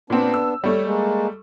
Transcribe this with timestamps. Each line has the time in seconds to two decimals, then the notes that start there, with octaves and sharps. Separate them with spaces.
0.10 A#2 B3 C4 D4
0.34 E6
0.64 G3 A3 C#5
0.84 G#3 A#3